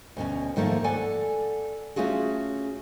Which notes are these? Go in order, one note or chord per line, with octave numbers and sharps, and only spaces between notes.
D2 B2 C#4
G#2 D#3 F3 A3 A#3
A4 D5 F#5 G#5
A3 C#4 F4 F#4 G#4